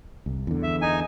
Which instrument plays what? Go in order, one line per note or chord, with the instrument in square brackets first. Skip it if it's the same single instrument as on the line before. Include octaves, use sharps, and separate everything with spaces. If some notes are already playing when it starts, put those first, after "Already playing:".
[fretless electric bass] C2
E2 D3
[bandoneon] E5
D#4 G#5